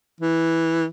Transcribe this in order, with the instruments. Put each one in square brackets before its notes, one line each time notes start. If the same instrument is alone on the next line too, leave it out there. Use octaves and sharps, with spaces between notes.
[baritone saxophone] E3